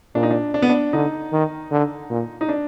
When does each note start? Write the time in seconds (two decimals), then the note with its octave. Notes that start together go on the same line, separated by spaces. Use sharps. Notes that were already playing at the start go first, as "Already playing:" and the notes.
0.15 A#2 D4
0.23 D#4
0.31 D4
0.54 D4
0.62 B3
0.69 D4
0.93 D3 D#4
1.32 D#3
1.71 D3
2.10 A#2
2.41 D#4
2.49 D4